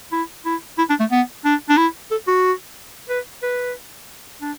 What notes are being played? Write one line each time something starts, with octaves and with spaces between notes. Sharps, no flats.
E4
E4
E4
D4
A3
B3
D4
D4
E4
A4
F#4
B4
B4
D4